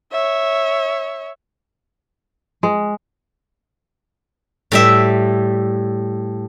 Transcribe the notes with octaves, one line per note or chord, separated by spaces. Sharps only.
C#5 E5
G#3
A2 G3 E5